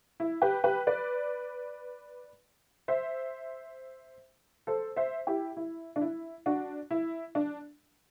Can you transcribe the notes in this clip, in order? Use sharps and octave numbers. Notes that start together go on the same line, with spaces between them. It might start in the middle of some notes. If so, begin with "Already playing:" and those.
E4
G4 B4
G4 B4
B4 D5
C5 E5
A4 C5
C5 E5
E4 G4
E4
D4
E4
D4 F#4
E4
D4